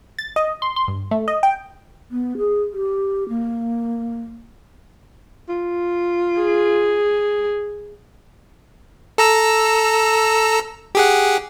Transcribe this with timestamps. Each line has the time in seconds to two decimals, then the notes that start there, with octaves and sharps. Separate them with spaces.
0.19 A6
0.36 D#5
0.62 C6
0.76 C6
0.88 G2
1.11 A3
1.28 D#5
1.43 G5
2.11 B3
2.38 G#4
2.73 G4
3.29 A#3
5.49 F4
6.41 G#4
9.18 A4 A#5 E6
10.95 G4 G#4 F#5